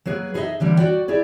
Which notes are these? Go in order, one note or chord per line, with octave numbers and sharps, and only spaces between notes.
F#3 A#3 G#4 B4
D#4 G#4 A4 B4 D#5 E5
D3 E3 G3 A#3
F#4 D5 G5
E4 G4 G#4 D5